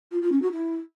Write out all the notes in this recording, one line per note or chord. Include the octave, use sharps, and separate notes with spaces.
F4
F4
C#4
F#4
E4